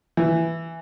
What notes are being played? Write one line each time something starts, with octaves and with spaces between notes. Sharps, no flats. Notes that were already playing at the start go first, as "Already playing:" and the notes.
E3